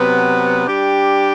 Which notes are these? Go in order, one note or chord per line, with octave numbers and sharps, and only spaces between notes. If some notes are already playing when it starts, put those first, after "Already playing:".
Already playing: C3 F#3 B3
G3 D4 G4